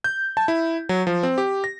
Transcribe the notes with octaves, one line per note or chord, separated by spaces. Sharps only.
G6
A5
E4
F#3
F3
C4
G4
A#6